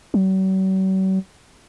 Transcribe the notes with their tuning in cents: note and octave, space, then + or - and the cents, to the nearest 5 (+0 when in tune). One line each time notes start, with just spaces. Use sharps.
F#3 +45